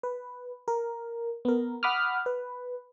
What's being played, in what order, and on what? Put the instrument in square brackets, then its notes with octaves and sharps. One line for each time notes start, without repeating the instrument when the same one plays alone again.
[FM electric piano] B4
A#4
B3 A#4
F#5 B5 D6 D#6 F6
B4